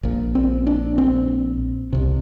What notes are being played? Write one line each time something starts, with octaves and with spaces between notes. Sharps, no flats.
A#1 A#2
C4
D4
C4
C2 C3